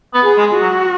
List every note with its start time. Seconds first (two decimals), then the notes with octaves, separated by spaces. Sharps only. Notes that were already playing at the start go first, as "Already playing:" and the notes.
0.14 B3
0.22 G#4
0.38 G#3
0.53 F#4
0.62 F#3